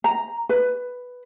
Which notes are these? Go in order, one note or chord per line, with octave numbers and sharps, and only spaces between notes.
A#5
B4